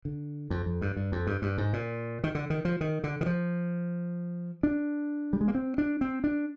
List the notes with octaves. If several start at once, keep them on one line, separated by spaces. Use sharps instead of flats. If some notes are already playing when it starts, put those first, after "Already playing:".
D3
F2
F2
G2
G2
F2
G2
G2
G#2
A#2
D#3
D3
D#3
F3
D#3
D3
D#3
F3
D4
G3
G#3
A#3
C4
D4
C4
D4